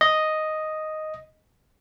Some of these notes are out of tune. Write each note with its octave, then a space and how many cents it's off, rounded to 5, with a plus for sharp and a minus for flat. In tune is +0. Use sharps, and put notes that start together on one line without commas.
D#5 +0